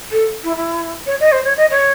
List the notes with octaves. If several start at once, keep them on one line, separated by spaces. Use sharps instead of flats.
A4
E4
E4
C#5
D#5
C5
C#5
D#5
C#5